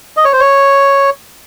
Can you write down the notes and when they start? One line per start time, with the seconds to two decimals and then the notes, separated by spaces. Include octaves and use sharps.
0.17 D#5
0.25 C#5
0.33 C5
0.40 C#5